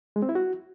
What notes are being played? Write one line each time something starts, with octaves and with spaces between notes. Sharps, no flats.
G#3
C4
E4
F#4